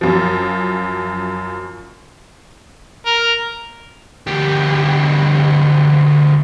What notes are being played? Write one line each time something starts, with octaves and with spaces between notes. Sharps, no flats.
F#2 F3
A#4
D2 G4